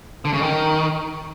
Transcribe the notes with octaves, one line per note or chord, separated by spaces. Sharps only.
D3
C#3
D#3